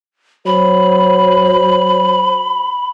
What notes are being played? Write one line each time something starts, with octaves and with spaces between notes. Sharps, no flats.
F#3 C5 B5